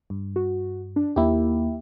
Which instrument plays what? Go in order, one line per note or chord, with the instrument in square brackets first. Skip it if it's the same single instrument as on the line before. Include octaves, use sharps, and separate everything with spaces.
[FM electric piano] G2
[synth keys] F#4
D4
[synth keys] D#2 A#3 [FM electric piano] E4 G4